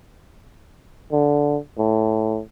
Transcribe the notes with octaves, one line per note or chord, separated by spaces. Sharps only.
D3
A2